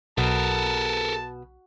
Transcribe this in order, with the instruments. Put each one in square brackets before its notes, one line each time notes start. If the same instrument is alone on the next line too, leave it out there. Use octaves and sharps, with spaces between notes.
[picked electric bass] B1 [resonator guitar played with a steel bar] B2 [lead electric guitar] A4 A#4 [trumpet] A5